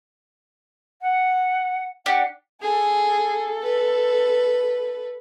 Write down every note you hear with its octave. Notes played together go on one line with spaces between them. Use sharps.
F#5
D4 G4 F#5
G#4 A4
B4